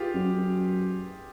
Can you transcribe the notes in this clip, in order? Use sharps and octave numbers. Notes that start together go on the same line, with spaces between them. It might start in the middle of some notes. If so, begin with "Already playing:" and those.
Already playing: F4 G4 G#4
F#2
F#2